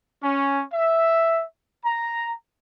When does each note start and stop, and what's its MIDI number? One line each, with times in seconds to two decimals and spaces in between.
0.22 0.63 61
0.73 1.44 76
1.85 2.32 82